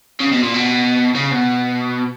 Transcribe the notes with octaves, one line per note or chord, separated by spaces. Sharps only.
C#3
B2
A#2
B2
C#3
B2